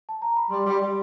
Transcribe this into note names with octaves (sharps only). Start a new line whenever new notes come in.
A5
A#5
B5
G3 C6
G3
G3